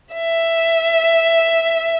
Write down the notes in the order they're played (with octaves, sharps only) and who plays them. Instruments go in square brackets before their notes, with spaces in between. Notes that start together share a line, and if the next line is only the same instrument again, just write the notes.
[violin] E5